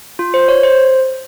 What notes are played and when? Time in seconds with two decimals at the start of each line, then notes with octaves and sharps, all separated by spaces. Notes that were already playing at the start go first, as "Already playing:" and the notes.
0.19 F4
0.34 C5
0.48 C#5
0.63 C5